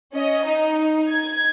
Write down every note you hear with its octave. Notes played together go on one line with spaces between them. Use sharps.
C#4 D#5
D#4
G#6